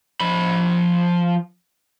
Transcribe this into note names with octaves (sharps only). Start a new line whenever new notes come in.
F3 B5